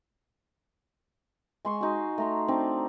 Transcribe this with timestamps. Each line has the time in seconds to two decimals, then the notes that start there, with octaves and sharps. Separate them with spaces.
1.65 G#3 C6 C#6
1.81 D#4 F#4
2.18 A3 A#5 C6
2.48 C4 D4 D#4